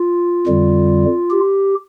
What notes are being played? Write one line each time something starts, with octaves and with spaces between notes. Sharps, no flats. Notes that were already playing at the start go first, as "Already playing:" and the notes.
Already playing: F4
F2 D3 G3
G4